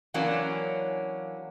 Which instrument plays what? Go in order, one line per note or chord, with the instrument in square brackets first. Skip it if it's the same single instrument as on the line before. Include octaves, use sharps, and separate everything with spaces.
[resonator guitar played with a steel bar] E3 F#3 A#3 C#4 D4